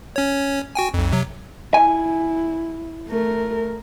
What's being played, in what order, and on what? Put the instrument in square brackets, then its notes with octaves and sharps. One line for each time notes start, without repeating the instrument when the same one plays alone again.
[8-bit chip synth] C#4 C#5
F#4 G5 G#5
B1 F2
C3 F#3
[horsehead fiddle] E4 [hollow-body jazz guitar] G#5
[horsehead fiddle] A3 A#4